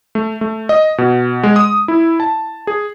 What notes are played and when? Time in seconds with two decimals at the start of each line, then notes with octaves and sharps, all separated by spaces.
0.15 A3
0.41 A3
0.69 D#5
0.98 B2
1.43 G#3
1.56 D#6
1.88 E4
2.20 A5
2.67 G#4